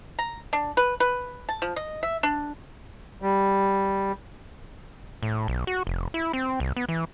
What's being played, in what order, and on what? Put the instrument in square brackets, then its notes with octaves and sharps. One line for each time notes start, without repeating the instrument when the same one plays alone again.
[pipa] A#5
D4
B4
B4
A5
F3
D#5
E5
D4
[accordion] G3
[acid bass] A2
B1
F#4
F1
E4
C4
C2
B3
E3